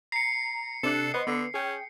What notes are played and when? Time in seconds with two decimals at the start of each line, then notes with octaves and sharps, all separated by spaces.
0.12 A#5 C7 C#7
0.83 C3 D4 A4 F#6
1.14 B3 B4 C5 D#5
1.27 D3 B3
1.54 C#4 G#4 G5